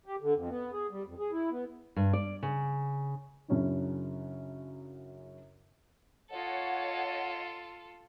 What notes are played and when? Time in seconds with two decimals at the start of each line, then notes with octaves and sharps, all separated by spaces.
0.06 G4
0.22 D3
0.36 F2
0.49 B3
0.72 G#4
0.91 G3
1.06 F2
1.19 G#4
1.32 E4
1.52 B3
1.96 G2
2.13 D5
2.43 C#3
3.48 F#2 C#3 F#3 C#4 D4 E4
6.30 F4 A4 C#5 D#5 F#5